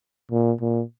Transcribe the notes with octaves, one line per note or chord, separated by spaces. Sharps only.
A#2
A#2